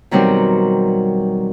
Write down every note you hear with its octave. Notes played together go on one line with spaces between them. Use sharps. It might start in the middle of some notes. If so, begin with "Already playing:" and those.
B2 D#3 F#3 G3 C4